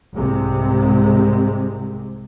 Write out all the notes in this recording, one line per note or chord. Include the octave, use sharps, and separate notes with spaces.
C2 G#2 C3 G#3